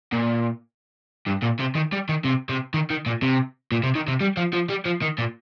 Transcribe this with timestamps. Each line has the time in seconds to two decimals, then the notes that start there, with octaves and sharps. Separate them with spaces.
0.13 A#2
1.27 G2
1.43 A#2
1.60 C3
1.75 D#3
1.93 G3
2.09 D#3
2.24 C3
2.49 C3
2.74 D#3
2.90 D#3
3.06 A#2
3.22 C3
3.72 A#2
3.83 C3
3.95 D#3
4.08 C3
4.21 G3
4.37 F3
4.53 F3
4.69 G3
4.85 F3
5.02 D#3
5.18 A#2